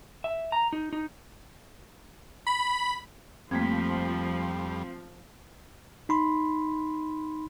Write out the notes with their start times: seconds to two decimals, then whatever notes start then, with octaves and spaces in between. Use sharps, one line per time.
0.24 E5
0.52 A#5
0.73 D#4
0.93 D#4
2.47 B5
3.51 F2 F3 G3 A3 A#3 C4 G#6 B6
6.09 D#4 B5 C6